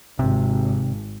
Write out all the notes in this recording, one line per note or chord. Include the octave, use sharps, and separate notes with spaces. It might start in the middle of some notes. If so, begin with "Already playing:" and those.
G#1 C3